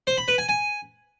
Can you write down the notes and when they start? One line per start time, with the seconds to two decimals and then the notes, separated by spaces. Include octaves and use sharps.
0.07 C5
0.18 B5
0.28 B4
0.38 G#5
0.49 G#5